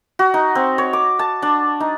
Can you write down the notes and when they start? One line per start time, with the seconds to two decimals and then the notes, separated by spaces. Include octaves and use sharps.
0.19 F#4
0.34 D#4
0.55 C4
0.78 C#5
0.93 D6
1.19 A5
1.42 D4
1.80 D#4